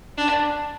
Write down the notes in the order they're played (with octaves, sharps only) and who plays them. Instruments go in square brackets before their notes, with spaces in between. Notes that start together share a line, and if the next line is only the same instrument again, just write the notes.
[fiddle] D4